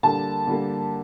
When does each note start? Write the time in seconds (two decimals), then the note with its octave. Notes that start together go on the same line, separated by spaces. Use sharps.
0.03 D3 G3 A#3 A5
0.47 D3 G3 A#3